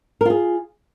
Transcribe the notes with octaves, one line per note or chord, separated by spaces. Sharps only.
F4 G#4 A#4